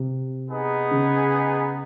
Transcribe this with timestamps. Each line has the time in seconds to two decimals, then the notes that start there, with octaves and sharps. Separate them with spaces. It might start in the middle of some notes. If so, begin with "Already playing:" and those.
Already playing: C3
0.49 B3 D#4 G#4
0.91 C#3